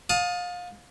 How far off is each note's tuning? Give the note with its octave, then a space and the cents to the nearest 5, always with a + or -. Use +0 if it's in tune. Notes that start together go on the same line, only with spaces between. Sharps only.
F5 +30 A5 +0 D#6 +0